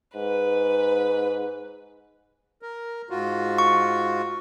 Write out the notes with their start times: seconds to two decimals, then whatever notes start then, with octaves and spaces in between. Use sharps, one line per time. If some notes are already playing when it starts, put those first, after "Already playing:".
0.15 G#2 B4
2.62 A#4
3.10 G#2 F4 F#4
3.58 C#6